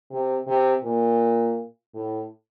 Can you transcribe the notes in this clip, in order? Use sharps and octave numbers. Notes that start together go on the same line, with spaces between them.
C3
C3
A#2
A2